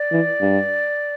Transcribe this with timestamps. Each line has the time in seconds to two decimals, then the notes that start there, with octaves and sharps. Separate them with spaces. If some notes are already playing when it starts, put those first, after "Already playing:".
Already playing: D5
0.12 E3
0.41 G2